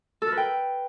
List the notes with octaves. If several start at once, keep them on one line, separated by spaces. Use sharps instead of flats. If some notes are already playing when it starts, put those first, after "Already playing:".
A4
A#4
B4
G5